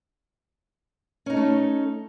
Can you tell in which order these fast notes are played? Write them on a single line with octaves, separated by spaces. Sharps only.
C#4 D#4 A4 A3